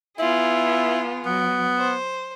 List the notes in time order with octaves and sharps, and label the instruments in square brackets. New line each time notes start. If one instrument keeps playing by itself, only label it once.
[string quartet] B3 F4 G#4 [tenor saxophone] E4
[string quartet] F#3 [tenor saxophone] B3
[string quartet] C5